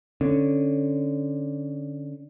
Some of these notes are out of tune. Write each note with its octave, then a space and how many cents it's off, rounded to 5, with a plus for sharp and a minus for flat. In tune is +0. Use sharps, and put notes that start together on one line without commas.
D3 +0 C#4 -5